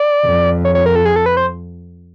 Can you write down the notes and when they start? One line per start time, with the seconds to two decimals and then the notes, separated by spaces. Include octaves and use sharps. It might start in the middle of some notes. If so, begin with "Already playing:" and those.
Already playing: D5
0.25 F2
0.65 C#5
0.75 C#5
0.86 A#4
0.95 A4
1.05 G#4
1.16 A4
1.26 B4
1.37 C5